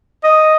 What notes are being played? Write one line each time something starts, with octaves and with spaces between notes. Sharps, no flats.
D#5